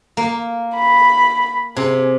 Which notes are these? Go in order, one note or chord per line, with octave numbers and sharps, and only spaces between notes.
A#3
B5
C3 G#4